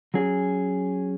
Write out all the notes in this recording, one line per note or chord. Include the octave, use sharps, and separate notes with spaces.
F#3 C#4 G#4